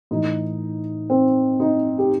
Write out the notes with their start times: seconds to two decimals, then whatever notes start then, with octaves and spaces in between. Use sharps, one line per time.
0.11 A2 E3 D#4
1.10 C4
1.60 D#4
1.98 G4